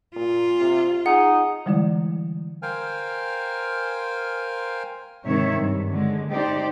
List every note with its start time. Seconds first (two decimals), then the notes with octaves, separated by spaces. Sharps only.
0.16 A#2 F4
0.60 C3
1.06 D#4 G#4 F#5
1.66 D3 E3 G3 G#3 E4 D5
2.62 A#4 C5 F5 G5 G#5 F6
5.24 G#2 C3 D#3 C4 C#5 E5
5.56 G2
5.90 D3 G#3
6.29 D#4 G4 C5 D5